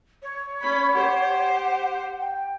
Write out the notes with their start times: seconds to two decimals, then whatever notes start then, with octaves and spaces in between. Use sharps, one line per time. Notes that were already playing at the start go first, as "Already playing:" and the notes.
0.22 C#5
0.62 C#4 B5 C#6
0.94 G4 C5 F#5
2.20 G5